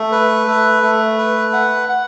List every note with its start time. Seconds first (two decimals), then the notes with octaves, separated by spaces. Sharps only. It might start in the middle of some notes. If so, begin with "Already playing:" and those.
Already playing: A3
0.12 B4
0.47 A3
0.83 A3
1.18 B4
1.53 F#5
1.89 F#5